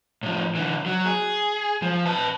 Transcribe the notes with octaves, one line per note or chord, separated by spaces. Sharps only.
A2 F3
D3 E3
F#3
G#4
F3
B4 A5